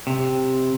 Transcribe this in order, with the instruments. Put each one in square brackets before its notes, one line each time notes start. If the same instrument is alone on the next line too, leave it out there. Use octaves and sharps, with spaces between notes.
[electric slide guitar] C3